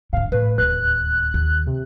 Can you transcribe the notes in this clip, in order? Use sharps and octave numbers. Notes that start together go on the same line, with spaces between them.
G#2 D3 F5
A2 B4
D1 D#2 F#6
D#2
C3